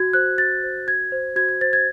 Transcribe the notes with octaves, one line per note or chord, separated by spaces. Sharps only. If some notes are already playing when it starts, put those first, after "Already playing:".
Already playing: F#4 G#6
C5 F#6
F#4 A6
C5
F#4 G#6
C5
F#4 G#6
G#6
C5 A6
G#6